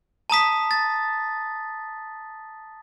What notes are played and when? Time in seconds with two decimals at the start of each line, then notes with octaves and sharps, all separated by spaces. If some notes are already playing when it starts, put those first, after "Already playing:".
0.30 A5 A#5 D#6 B6
0.71 A6